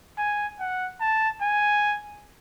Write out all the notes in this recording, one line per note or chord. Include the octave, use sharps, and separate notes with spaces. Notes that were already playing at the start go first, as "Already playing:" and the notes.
G#5
F#5
A5
G#5